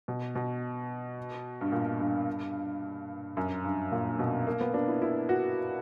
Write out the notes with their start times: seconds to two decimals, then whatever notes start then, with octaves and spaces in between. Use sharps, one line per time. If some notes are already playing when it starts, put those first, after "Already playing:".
0.08 B2
0.35 B2
1.61 G2
1.72 A#2
2.00 G2
3.37 F#2
3.64 G2
3.92 A#2
4.19 B2
4.47 A#3
4.61 B3
4.74 D4
4.88 E4
5.02 E4
5.29 F#4